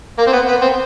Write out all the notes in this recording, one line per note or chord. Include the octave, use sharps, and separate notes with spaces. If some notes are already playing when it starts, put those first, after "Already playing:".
A#3
C4
B3
B3
C4